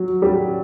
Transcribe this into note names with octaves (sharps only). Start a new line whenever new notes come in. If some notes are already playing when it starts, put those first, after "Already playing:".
Already playing: F#3
G3